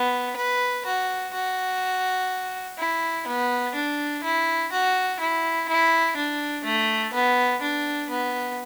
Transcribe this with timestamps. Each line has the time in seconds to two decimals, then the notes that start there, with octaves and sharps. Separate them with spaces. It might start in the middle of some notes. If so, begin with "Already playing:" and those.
Already playing: B3
0.37 B4
0.86 F#4
1.33 F#4
2.78 E4
3.27 B3
3.75 D4
4.24 E4
4.72 F#4
5.20 E4
5.69 E4
6.16 D4
6.65 A3
7.13 B3
7.62 D4
8.10 B3